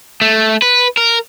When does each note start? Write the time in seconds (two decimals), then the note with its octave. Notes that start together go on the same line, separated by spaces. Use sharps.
0.22 A3
0.62 B4
0.97 A#4